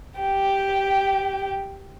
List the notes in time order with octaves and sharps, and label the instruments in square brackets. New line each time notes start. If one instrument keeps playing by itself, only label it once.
[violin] G4 G5